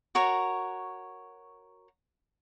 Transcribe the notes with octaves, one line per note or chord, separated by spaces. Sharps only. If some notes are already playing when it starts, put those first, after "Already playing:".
F#4 A#4 C#5